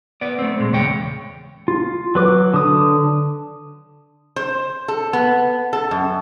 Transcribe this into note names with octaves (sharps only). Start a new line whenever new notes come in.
B3 D5
A3 C4
A#2 G#3
E2 C#3 C#5 G5
F4
F#3 B4 D6
D3 D#6
C5
A4
B3
A4
F#2